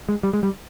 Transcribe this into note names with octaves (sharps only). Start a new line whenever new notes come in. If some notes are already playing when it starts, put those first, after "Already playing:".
G#3
G3
G#3
G3